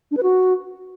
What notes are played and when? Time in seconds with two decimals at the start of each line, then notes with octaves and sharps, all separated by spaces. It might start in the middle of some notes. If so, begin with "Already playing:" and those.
0.11 D4
0.17 B4
0.23 F#4